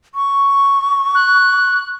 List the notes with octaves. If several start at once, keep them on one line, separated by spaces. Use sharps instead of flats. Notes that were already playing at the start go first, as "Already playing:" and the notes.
C#6
F#6